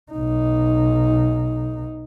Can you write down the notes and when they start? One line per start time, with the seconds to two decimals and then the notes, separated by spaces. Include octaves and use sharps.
0.12 B1 D#4